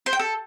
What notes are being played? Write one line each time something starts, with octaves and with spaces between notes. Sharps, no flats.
C5
G5
A4